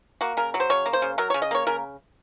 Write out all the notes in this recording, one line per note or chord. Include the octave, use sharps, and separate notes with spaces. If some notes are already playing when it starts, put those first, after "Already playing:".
A#3 F#4
C#3 A#4
F#3
C5
C#3 C#5
A#3
C5
C#3
F#3 A#4
C#5
C#3
D#5
A#3 C#5
C#3 A#4